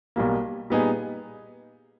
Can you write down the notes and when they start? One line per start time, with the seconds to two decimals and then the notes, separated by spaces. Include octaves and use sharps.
0.16 B1 B2 G3 A#3
0.70 A#2 G3 B3 D#4 G#4